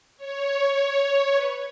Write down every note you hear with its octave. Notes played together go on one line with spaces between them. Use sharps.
C#5
B4